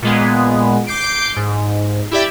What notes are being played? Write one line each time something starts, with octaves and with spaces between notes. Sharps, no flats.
A#2 G#3 B3
D6 G6 C7 D7
G#2
E4 G4 D5 E5